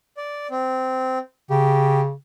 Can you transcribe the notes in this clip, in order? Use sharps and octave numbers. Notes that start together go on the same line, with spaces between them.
D5
C4
C#3 G4